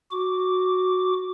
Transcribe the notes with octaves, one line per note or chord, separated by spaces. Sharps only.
F#4 D6